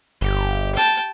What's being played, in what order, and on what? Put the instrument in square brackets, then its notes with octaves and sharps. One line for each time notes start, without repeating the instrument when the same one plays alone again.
[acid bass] G1 [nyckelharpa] G4
[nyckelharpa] G5 A5